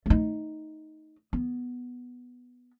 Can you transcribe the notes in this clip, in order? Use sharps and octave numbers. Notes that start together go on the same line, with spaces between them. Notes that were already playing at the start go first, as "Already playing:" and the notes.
A3 D#4
B3